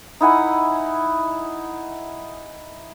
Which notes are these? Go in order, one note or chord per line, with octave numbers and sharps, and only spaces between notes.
D#4 E4 F#5 G#5